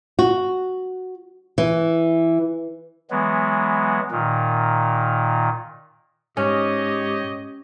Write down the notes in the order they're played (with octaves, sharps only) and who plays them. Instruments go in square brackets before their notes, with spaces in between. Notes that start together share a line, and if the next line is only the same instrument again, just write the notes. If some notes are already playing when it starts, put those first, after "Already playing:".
[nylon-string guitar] F#4
E3
[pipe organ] E3 F#3 G#3 B3
A#2 D#3
[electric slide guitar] G#2 [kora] C#4 [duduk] G4 [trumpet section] C#5 D#5